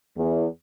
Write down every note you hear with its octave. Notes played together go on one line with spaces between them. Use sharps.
E2